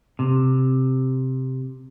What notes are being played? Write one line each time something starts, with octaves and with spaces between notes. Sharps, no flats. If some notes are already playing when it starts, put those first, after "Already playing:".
C3